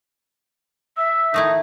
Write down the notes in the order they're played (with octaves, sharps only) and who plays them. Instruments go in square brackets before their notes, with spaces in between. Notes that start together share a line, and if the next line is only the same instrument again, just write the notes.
[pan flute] E5 [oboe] E6
[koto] D#3 A3 E4 [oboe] D#4